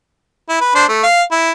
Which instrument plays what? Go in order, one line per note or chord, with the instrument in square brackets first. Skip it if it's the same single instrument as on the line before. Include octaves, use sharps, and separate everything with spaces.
[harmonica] E4
B4
D4 C5
A3
F5
E4